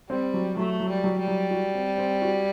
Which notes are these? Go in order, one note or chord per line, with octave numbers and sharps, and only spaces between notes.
G3 C4
F#3
F#3 A3
F#3
G3
F#3
G3
F#3
F#4
C4
C4
F#4